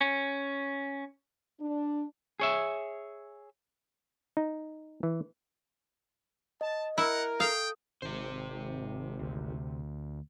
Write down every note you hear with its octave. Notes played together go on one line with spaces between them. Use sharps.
C#4
D4
G#4 C#5 E5
D#4
E3
D#5 A5
E4 A#4 F#5
A4 F5 G5 D#6
G#1 C3 C5
D2